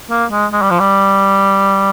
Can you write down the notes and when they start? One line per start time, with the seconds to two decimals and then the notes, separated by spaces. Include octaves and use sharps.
0.10 A#3
0.31 G#3
0.53 G#3
0.62 G3
0.70 F3
0.80 G3